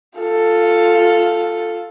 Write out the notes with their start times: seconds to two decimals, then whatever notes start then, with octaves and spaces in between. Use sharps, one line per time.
0.19 F4 A4